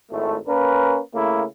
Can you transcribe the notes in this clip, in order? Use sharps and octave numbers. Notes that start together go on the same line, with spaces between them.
G#1 A2 A3
A#3 C#4 A#4 B4
C#3 A3 A#3 E4